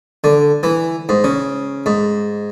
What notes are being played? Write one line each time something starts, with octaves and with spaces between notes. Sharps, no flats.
D3
E3
G#2
C#3
G#2